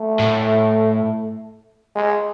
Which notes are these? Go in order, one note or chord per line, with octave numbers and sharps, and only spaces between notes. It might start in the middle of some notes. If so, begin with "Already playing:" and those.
Already playing: A3
A2
G#3